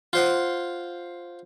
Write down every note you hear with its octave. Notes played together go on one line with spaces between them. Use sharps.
F4 C5 F#5